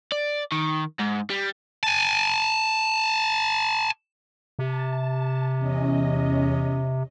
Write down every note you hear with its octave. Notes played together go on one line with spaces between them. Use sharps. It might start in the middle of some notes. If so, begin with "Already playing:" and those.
D5
D#3
G#2
G3
G#5 A5
C3 A5
E2 C#4 D#5